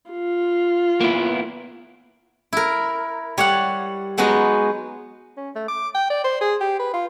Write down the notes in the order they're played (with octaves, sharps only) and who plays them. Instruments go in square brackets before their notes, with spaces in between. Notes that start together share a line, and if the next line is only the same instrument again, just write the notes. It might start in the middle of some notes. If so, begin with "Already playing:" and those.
[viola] F4
[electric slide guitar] A#3 B3 E4
[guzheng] E4 A#4
G3 C#5 D5 F#5
F#3 G#3 B3 D#4 F#4
[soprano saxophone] C#4
A3
D6
G5
D5
C5
G#4
G4
B4
F4